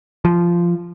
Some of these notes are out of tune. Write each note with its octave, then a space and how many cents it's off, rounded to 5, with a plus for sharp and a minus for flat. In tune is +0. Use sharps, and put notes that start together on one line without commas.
F3 -15